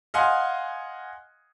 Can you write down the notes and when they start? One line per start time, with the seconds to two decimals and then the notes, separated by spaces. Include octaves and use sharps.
0.14 D#5 F5 F#5 G#5 C6